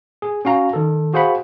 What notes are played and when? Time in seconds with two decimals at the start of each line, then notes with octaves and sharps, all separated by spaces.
0.22 G#4
0.45 C#4 F#4 F5 A#5
0.73 D#3 A4
1.14 F#4 G#4 C5 F5 F#5 B5